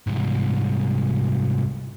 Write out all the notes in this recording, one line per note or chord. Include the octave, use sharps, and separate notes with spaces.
C2 G#2